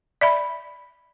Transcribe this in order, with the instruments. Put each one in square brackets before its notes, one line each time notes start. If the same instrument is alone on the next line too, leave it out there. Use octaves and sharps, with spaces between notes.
[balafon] D5 E5 B5